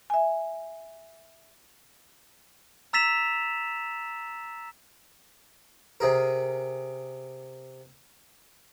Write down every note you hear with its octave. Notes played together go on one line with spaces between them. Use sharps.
E5 G#5
A#5 E6 A6 B6 E7 F7
C3 G#4 A#4